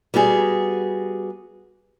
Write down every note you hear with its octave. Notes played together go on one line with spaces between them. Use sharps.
G3 B3 F#4 G#4